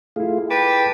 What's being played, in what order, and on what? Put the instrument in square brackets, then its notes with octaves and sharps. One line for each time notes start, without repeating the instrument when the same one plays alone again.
[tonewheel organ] A3 F4 [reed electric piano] E4 G#4
[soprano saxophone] B4 [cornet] G5 [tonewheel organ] A5 D6